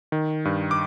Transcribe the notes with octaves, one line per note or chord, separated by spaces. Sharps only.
D#3
G2
D6